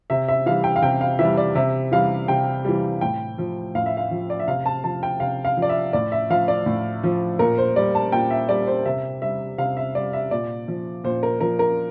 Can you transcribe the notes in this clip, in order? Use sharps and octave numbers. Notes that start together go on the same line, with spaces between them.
C3 E5
E5
E3 G3 F5
G5
F5
C3 G5
F5
E3 G3 E5
D5
C3 E5
E3 G3 F5
C3 G5
E3 G3
A2 G5
F3
A2 F5
E5
F5
F3
D5
E5
C3 F5
A5
F3 A5
G5
C3 F5
F5
F3
D5
E5
A2 D5
E5
F3 F5
D5
A2
F3
A#2 A#4
C5
G3 D5
A5
A#2 G5
E5
G3 D5
C5
C3 E5
G3 E5
C3 F5
E5
G3 D5
E5
A#2 D5
F3
A#2 C5
A#4
F3 A#4
A#4